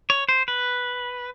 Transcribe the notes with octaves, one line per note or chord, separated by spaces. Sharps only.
C#5
C5
B4